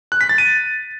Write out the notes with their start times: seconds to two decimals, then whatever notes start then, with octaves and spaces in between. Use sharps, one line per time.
0.12 F#6
0.21 B6
0.29 A6
0.38 D#7